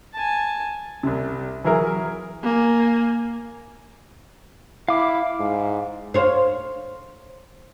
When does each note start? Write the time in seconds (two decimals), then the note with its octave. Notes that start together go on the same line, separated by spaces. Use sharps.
0.14 G#5 A5
1.03 C2 C3
1.64 E3 F#3 E4 G#4 A#4
2.44 A#3 G#5
4.89 E4 F5 D6
5.40 G#2
6.14 C5 C#5 F5